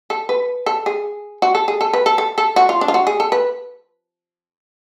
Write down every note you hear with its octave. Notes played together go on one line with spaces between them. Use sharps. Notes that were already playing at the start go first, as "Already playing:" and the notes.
A4
B4
A4
G#4
F#4
A4
G#4
A4
B4
A4
A4
A4
F#4
F4
D4
F4
F#4
G#4
A4
B4